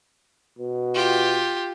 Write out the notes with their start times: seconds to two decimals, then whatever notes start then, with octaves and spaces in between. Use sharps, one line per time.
0.59 B2
0.94 F4 G4